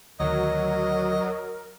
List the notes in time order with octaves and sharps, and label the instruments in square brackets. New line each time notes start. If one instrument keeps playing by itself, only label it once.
[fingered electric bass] D2 D#3 [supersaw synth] F#3 [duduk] A#4 [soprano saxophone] D#5